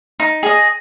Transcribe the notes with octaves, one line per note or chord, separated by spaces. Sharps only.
D#4
G#4 D#5